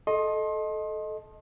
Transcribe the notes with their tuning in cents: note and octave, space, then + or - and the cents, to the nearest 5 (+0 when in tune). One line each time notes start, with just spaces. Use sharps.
A4 -15 D#5 +0 C6 +30